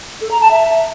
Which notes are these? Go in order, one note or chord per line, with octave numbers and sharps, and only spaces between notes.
A4
A#5
A5
E5